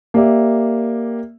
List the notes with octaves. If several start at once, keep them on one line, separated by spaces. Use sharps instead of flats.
A#3 G4 D5 E5